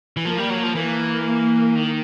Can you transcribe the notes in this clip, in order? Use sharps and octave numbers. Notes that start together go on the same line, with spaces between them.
E3
F3 A#3
G3
F#3
F3
E3 A#3
D#3